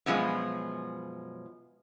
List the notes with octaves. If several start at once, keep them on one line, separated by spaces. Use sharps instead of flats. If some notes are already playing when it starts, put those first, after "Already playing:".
F#2 B2 F3 G#3